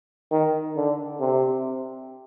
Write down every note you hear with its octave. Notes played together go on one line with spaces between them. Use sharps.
D#3
D3
C3